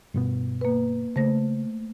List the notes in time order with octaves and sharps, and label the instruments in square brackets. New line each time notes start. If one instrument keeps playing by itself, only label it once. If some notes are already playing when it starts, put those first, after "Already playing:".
[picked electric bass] G2 B2 B3
[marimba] A#3 B4
[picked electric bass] C#3 [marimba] A3 C5 A#6